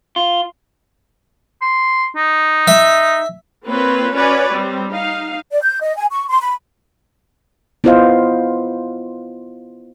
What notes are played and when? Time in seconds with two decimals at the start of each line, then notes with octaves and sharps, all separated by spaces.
0.16 F4
1.62 C6
2.16 D#4
2.67 E5
3.66 A#3 C4 F4 B4 C#5
4.13 C#4 F#4 B4 C#5 D5
4.51 G3 C4
4.91 D#4 F5
5.51 D5
5.62 G6
5.82 D#5
5.96 G#5
6.12 C#6
6.28 C6
6.42 B5
7.84 B3 E4 F4 C5 D#5 F5